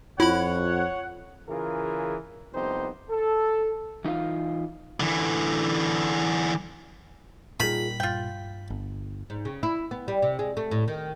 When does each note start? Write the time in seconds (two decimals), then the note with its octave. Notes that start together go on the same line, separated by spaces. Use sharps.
0.20 F2 E4 F4 C#5 F#5 B5
1.48 C#3 E3 F4 G#4 A#4
2.53 C2 F2 B3 D#4 G4 C5
3.09 A4
4.05 E3 D#4 F4 F5
5.00 D3 E3
7.60 A#2 D#3 G3 F4 G#4 B5
8.00 G2 F4 G5
8.70 G1
9.30 G#2
9.45 C#3
9.63 E4
9.91 B3
10.08 G3
10.22 C3
10.39 G#3
10.57 A3
10.71 A2
10.88 D#3